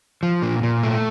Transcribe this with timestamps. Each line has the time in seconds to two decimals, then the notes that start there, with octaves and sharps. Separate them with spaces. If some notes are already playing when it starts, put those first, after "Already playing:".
0.23 F3
0.42 A#2
0.63 A#2
0.83 A3